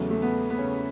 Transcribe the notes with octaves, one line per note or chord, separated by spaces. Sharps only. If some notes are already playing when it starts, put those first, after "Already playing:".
Already playing: E2 C#3 F#3 A3
A3
B3
B3
C#3 C#4